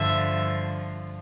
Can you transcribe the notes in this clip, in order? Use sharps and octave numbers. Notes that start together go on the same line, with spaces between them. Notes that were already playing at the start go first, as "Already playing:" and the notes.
Already playing: G2 D3 F3 E5